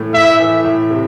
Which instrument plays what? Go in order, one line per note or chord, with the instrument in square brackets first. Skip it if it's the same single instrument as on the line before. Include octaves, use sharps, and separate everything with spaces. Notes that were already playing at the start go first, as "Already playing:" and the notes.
Already playing: [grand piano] A2 E3 A3
[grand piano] A2 [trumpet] E5
[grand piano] E3
A2
C3